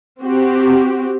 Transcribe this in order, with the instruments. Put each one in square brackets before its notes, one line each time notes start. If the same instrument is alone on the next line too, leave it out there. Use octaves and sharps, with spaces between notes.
[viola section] C4 F#4 G4